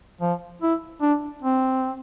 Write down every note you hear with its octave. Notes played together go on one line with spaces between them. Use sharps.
F3
E4
D4
C4